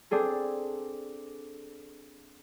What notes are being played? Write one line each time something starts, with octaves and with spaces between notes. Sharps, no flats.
C4 D4 G#4 A4